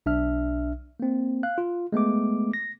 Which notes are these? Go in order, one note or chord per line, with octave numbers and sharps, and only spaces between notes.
B1 D4 E5 F6
A#3 C4
F5 F#6
F4
G#3 A3 B3 D6
A#6